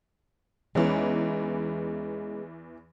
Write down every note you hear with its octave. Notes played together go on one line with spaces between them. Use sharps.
E2 E3 G#3 C#4 D#4